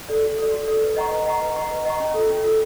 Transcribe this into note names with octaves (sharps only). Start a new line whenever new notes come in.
A4 D5
F#4
A4 D5
F#4
A4 D5
B4
D#5 F#5 A#5 C#6
B4
D#5 F#5 A#5 C#6
B4
D#5 F#5 A#5 C#6
B4
D#5 F#5 A#5 C#6
C#4
F4 A4
C#4
F4 A4